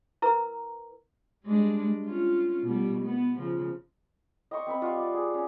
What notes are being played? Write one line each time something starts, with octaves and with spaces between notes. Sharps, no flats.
E4 A#4 B4 A#5 E6
G3 G#3 D4
C#4 F4
B2 G3
B3
C#3 F3
D#5 G5 C6 C#6
C4 B4 B5
G3 F4 F#5 C#6
D5
G#4
C#4